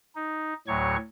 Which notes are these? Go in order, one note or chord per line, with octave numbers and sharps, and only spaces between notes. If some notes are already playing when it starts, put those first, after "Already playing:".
D#4
D2 A2 F#3 C#5 C#6